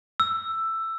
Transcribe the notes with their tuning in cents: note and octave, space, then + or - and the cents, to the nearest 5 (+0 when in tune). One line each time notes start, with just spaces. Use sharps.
E6 +10